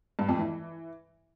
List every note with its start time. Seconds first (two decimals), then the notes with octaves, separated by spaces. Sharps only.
0.19 G2
0.29 F2
0.39 E3